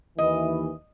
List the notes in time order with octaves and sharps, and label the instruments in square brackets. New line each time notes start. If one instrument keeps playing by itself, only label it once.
[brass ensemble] D#2 E3 [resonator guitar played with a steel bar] D#5